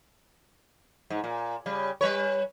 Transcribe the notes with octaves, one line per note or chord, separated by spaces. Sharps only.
G#2
A#2
C#3 G3
G3 B4 C#5